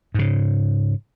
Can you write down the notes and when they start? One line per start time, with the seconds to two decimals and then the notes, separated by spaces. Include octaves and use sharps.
0.14 G#2 C#3